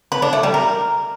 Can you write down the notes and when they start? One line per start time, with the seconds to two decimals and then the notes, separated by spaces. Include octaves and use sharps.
0.12 B4
0.22 D4
0.33 A3
0.43 G3
0.54 A#4